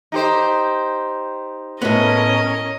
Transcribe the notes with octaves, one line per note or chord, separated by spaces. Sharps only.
D#4 G4 C5
A2 B3 C#4 A#4 D#5